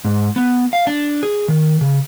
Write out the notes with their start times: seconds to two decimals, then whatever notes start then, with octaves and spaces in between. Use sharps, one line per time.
0.05 G#2
0.36 B3
0.73 F5
0.87 D4
1.23 G#4
1.48 D#3
1.81 C#3